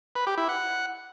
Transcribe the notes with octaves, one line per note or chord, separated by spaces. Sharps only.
B4
G4
E4
F#5